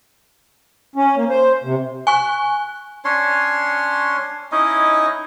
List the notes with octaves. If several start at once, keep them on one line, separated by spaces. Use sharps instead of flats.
C#4
A#3
C5
C3
G#5 C#6 F#6
C#4 D4 C#5 C6
C#4 D#4 E4 D#5